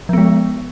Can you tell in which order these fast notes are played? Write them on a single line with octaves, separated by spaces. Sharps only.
F3 B3 G#3